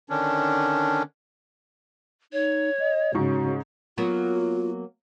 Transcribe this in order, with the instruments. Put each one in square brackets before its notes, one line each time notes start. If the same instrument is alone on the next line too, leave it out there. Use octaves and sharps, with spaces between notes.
[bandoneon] D3 D#3 C#4 D4
[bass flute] D#4 [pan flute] C#5
[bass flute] D#5
[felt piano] G#2 C#6 [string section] C#3 [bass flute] F#4
[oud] F#3 A#3 B3 [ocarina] F4